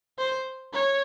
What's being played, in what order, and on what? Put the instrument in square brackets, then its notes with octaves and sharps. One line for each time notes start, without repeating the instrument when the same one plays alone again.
[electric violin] C5
C#5